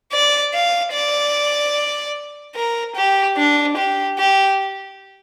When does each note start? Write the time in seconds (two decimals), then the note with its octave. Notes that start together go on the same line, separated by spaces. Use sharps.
0.12 D5
0.54 F5
0.93 D5
2.55 A#4
2.96 G4
3.37 D4
3.77 G4
4.18 G4